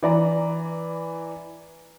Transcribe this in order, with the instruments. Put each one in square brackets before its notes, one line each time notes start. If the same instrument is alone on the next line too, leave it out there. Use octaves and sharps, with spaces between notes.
[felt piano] E3 D5 A#5